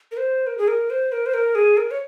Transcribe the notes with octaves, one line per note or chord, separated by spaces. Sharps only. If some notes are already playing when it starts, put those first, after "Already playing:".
A#4
C5
A#4
G#4
A#4
C5
A#4
C5
A#4
G#4
A#4
C#5